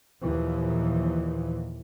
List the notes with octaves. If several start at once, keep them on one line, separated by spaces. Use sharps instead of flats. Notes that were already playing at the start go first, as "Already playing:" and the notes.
D#2 A#2 E3 F3